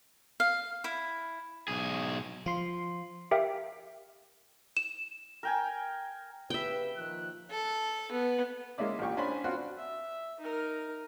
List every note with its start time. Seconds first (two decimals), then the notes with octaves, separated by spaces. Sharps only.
0.40 F5
0.84 E4
1.68 B1 G#4
2.46 F3 F4 C6
3.31 G4 A#4 E5 F5 G5
4.77 E7
5.43 A#4 G5 G#5
6.50 C#3 G4 B4 E5 G5
6.97 A#2 D#3 F3 F#6
7.50 A4
8.12 B3
8.78 G#3 A#3 C#4 E4 D5
8.99 A1 A#2 G4 C#6
9.17 C#4 D4 C5 G#5 B5
9.44 C4 D4 F4 F#4
9.77 E5
10.40 D#4 A#4